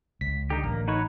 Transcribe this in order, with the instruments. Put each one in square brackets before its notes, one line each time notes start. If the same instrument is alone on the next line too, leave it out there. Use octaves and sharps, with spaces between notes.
[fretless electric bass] C#2 [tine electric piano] B6
[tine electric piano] D3 [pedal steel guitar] D#4 G4
[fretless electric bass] A1 [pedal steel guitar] A#3
[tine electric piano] D#4 [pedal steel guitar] F#4 B4 C#5